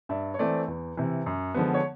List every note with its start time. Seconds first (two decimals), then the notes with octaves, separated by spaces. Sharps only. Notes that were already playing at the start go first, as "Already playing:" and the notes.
0.09 G2 D5 E5
0.34 C#5
0.39 E3 A3 C4 C5 D5
0.68 E2
0.97 C3 E3
1.26 F#2
1.55 D3 F3 G#3 B3
1.74 C#5